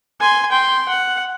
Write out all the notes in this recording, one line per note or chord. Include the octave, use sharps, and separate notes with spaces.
G#5 C6
G5 C6
F#5